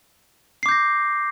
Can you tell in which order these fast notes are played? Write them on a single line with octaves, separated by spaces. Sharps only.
C7 D6 G6 A#6